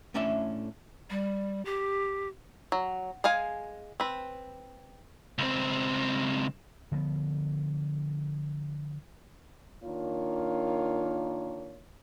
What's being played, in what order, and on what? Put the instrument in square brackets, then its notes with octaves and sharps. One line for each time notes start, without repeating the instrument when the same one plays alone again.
[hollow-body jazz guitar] A2 A3 C#4 D4 D5 E5
[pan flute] G3
G4
[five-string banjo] F#3
G#3 G#4 F5 G#5
C4 B4
[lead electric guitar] C#2 C4
[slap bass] D3 F3 G#3 B3
[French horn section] D#3 A#3 D4 F4 C#5